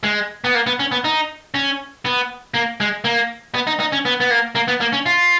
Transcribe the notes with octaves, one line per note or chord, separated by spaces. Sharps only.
G#3
B3
A#3
B3
C#4
B3
D#4
C#4
B3
A#3
G#3
A#3
B3
D#4
D#4
C#4
B3
B3
A#3
A#3
B3
A#3
C#4
F4